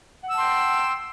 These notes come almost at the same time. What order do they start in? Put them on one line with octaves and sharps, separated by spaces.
F#5 E6 A5 C6 G5